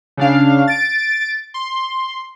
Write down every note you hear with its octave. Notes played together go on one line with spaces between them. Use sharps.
C#3 D4 F5
A6 D7
C6